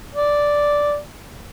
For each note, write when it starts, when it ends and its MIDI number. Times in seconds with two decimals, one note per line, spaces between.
0.15 0.97 74